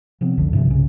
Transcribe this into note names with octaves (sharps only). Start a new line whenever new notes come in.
C3 F3 B3 C4
F1 C2 F2 D3
G2 C3 F3
C2 C#3